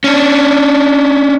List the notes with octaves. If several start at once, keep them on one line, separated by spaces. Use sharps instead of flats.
C#4 D4